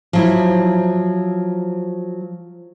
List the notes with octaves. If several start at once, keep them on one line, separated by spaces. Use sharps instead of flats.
F3 F#3 E4